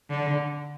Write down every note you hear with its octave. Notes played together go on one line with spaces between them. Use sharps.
D3